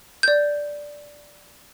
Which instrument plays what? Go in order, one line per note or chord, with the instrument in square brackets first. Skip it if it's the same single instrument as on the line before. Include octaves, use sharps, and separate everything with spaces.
[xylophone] D5 G6